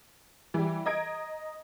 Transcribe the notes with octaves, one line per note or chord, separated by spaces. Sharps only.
E3 G3
D#5 A#5 G#6 D7